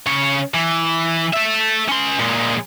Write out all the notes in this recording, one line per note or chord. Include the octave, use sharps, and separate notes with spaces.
C#3 C#5
E3
A4 E5
C#4 C6
A#2 G#3